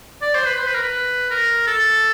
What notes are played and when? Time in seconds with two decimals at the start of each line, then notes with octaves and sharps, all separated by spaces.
0.22 D5
0.35 C5
0.46 B4
0.59 C5
0.67 B4
0.75 A#4
0.83 B4
1.31 A#4
1.67 A4